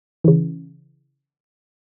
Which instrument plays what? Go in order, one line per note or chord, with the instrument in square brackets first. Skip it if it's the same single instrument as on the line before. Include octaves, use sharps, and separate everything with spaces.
[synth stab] C#3 E3